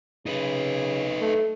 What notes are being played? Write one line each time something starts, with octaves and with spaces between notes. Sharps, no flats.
C#3 D#4 B4
A3